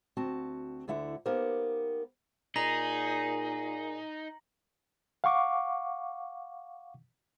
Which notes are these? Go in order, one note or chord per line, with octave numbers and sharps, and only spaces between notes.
D2 C4 F#4 A5
D2 D3 E4 E5 F#5
A#3 B3 D#4 G4 A#4 C5
A#2 D#4 G#4 A#5 A#6 F#7
F5 F#5 C#6 D6